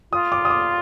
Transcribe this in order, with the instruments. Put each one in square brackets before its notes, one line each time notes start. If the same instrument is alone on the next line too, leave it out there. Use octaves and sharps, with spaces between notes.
[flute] F4 [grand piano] D#6
[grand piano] D6
D#6
D6